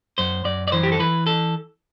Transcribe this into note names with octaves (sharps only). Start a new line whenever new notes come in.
F#2 C5
F#2 D5
D5
E3 C5
G4
A4
E3 B4
A4